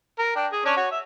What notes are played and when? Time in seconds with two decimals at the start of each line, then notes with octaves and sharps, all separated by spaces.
0.19 A#4
0.36 D4 G5
0.52 G#4
0.65 C#4 D4 C#5
0.77 F#4 C#5
0.91 E5